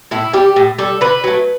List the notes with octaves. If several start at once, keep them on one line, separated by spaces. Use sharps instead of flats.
A2 E4
G3 G4
A2
G3 A4
D3 B4
F#3 A3